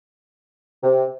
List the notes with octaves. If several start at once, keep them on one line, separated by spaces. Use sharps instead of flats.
C3